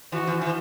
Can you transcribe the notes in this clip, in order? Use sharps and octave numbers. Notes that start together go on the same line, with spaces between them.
E3 F#4
E3
E3